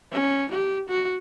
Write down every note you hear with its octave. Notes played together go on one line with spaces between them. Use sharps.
C#4
G4
F#4